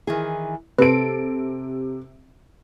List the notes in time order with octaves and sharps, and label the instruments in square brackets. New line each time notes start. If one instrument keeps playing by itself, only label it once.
[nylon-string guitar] D#3 E3 G#4
[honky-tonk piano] C3 D7 [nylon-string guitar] C4 A4 [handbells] B4